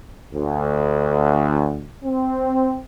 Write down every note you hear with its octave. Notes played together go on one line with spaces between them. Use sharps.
D2
C4